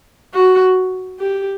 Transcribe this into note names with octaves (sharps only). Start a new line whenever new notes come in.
F#4
G4